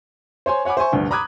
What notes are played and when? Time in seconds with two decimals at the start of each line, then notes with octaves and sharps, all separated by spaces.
0.46 C5 C#5 G#5 C6
0.65 C#5 F#5 G#5 B5 D6
0.77 C5 E5 G#5 C#6
0.92 F1 D2 G2
1.11 A#5 B5 D6 D#6 F#6 G#6